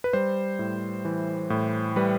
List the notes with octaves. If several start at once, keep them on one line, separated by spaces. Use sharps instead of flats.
B4
G3 C5
A2
E3
A2
G3 B4